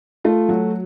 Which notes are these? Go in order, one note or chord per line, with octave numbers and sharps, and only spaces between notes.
A3 F4
F#3 F#4